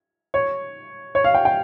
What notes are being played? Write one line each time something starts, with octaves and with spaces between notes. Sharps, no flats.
C#5
C#5
F5
G5
G5